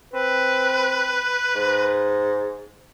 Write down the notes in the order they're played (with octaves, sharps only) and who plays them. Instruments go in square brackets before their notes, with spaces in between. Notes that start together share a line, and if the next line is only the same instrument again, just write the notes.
[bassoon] C4 [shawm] B4
[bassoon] G#2